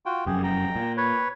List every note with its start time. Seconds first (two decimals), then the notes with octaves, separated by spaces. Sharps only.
0.06 F4 F#4 G5
0.26 F1 F#2 G4 G#4
0.44 G5 A#5
0.76 A#2
0.97 B4 C#5